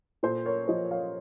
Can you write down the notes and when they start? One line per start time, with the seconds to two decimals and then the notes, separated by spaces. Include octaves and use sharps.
0.23 A#2 A4 C5
0.45 A#4 C#5
0.68 F3 C5 D#5
0.91 C#5 F5